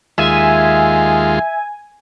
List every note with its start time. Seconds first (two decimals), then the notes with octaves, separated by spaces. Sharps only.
0.18 D#2 G#3 F4 E5 G#5